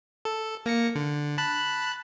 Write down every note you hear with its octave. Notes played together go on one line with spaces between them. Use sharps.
A4
A#3 A#6 C#7
D3
A5 B5 F#6